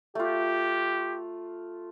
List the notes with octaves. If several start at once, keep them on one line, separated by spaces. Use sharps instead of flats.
A3 F4 G4